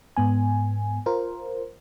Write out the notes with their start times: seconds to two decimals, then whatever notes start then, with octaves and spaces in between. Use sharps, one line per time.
0.17 G#2 B3 G#5
1.06 F4 A#4 C5